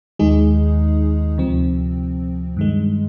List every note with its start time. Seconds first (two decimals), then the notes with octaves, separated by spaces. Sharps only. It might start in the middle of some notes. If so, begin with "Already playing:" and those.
0.19 D#2 D#3 G#3 D#4 G#4
1.38 D2 C3 F3 C4
2.57 G2 D#3 G#3